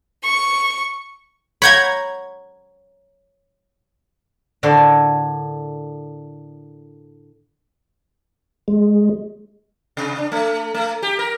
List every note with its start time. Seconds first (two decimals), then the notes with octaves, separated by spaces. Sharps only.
0.23 C#6
1.62 C#5 F#5 A#5 B5 G6 G#6
4.63 A2 D3 D4 A#4 C#5 C6
8.68 G#3
9.97 C3
10.18 D4
10.32 A3
10.74 A3
11.03 G4
11.19 A#4